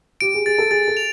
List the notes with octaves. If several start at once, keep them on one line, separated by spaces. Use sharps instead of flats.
G4 D7
G#4
G#4 A6
A4
G#4 A6
A4
F7